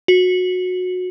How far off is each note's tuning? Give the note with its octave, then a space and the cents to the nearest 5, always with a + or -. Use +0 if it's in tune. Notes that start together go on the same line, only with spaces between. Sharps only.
F#4 -20